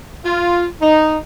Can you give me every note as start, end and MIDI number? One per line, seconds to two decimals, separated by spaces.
0.25 0.65 65
0.82 1.17 63